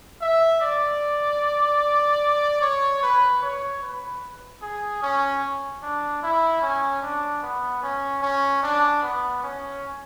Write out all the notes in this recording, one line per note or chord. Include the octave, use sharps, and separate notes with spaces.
E5
D5
C#5
B4
C#5
B4
G#4
C#4
D4
E4
C#4
D4
B3
C#4
C#4
D4
B3
C#4